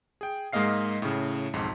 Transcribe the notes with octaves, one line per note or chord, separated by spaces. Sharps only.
G#4 G5
G#2 G#3 A#3 D#5 F5 C7
A2 C#3
B1 F2 G#2